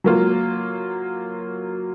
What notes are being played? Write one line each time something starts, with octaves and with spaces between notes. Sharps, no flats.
F#3 A#3 F4